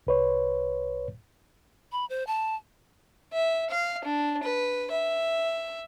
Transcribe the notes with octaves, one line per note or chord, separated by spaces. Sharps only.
C2 B4 C#5
B5
C5
A5
E5
F5
D4
B4
E5